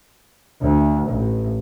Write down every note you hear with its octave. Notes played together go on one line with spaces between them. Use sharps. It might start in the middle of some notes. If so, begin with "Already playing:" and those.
D2
A1